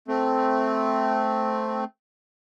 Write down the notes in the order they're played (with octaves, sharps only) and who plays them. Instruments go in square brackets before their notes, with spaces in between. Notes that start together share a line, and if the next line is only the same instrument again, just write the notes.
[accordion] A3 C4